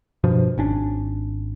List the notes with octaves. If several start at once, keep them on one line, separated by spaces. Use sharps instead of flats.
G2 B2 F3
G#1 C#4 D4